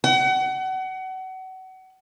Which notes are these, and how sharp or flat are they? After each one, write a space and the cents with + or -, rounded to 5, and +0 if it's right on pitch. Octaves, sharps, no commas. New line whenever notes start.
F#5 +30